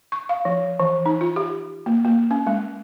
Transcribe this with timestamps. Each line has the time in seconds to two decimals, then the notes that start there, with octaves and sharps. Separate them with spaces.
0.12 C#6
0.29 F5
0.45 F3
0.80 E3
1.06 D#4
1.21 F4
1.36 G4
1.86 A#3
2.05 A#3
2.31 C#4
2.47 G#3